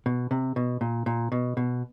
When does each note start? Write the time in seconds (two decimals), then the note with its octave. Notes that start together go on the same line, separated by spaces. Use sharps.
0.06 B2
0.31 C3
0.56 B2
0.81 A#2
1.06 A#2
1.32 B2
1.57 B2